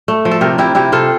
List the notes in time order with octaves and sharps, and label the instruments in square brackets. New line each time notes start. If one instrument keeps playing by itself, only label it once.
[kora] A3
F3
A4
C3 G4 A#4
C3 E4 G4
C3 E4 G4
C3 F4 A4